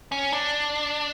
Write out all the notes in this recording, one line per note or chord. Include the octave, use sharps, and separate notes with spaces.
C#4
D4